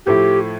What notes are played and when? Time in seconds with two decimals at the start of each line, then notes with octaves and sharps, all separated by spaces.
0.06 A2 F3 A3 E4 G4